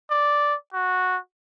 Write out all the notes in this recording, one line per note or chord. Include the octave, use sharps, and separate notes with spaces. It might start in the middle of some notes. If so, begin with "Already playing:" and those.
D5
F#4